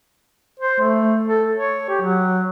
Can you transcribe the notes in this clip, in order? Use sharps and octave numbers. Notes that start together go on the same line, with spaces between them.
C5
A3
A4
C#5
G4
F#3